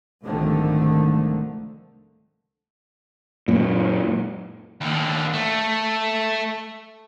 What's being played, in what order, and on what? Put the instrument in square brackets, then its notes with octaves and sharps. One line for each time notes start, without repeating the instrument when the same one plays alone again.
[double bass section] C2 G#2 D3 D#3 F3 A3
[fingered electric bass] F#2 A#2
[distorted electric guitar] D#2 D3
A3